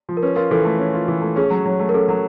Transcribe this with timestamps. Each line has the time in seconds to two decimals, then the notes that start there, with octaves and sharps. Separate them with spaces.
0.09 F3
0.17 A#4
0.23 C#4 B4
0.36 F4 A#4
0.51 E3 A4
0.65 A3
0.79 C#4
0.94 F4
1.08 E3
1.22 A3
1.36 C#4 G#4
1.50 F#3
1.65 F#3
1.79 A3
1.89 A#4
1.94 C#4 A4
2.09 F#3